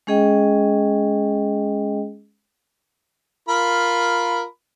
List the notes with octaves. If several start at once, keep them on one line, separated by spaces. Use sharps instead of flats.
G#3 C#4 G#4 D#5 G5
F4 A#4 B5